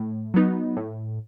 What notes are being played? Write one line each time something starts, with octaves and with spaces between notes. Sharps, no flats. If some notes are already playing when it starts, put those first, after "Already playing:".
Already playing: A2
F#3 B3 D#4
A2